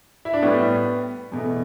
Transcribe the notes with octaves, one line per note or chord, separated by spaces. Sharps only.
E4
D4
A2 G3 B3
E2 B2 A3